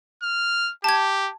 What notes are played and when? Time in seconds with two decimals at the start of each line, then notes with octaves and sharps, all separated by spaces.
0.23 F6
0.84 G4 A5 G#6